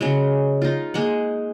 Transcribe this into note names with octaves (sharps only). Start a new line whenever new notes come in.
C#3 F#3 G#3
D#4 F4
G#3 A#3 F#5